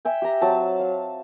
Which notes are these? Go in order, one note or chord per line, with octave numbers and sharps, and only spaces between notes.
E5 G5 G#5
G4 A#5
F#3 C4 A5
F5